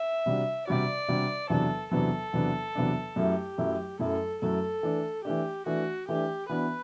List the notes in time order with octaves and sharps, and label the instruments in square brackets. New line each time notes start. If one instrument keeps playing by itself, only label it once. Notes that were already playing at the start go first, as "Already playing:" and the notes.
Already playing: [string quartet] E5
[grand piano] C3 G3 D4 F#4
[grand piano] C3 G3 D4 F#4 [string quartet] D5
[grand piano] C3 G3 D4 F#4
[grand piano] E2 C3 F#3 B3 D4 [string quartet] A4
[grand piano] E2 C3 F#3 B3 D4 [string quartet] A4
[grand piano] E2 C3 F#3 B3 D4
E2 C3 F#3 B3 D4
[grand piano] F#2 F#3 A3 E4 [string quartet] G4
[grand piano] F#2 F#3 A3 E4
[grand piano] F#2 F#3 A3 E4 [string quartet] A4
[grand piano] F#2 F#3 A3 E4 [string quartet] A4
[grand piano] E3 A3 D4
[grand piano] E3 A3 D4 [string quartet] G4
[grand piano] E3 A3 D4 [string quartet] F#4
[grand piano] E3 A3 D4 [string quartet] G4
[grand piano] E3 B3 D4 F#4 [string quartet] B4